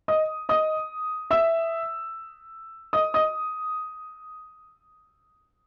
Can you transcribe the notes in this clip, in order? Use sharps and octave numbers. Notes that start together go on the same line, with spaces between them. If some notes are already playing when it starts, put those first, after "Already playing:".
D#5 D#6
D#5 D#6
E5 E6
D#5 D#6
D#5 D#6